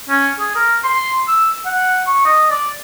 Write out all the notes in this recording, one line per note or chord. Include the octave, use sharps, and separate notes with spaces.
C#4
G#4
A#4
C6
E6
F#5
C#6
D#5
D5